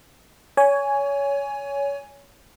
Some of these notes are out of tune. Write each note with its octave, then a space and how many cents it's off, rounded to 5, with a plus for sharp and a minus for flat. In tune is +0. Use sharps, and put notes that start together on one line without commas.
C#5 +25 G#5 +0